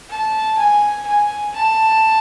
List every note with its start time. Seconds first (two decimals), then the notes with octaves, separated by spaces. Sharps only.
0.10 A5
0.58 G#5
1.07 G#5
1.56 A5